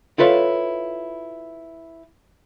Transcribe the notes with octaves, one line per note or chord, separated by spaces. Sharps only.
E4 F4 A4 B4 C#5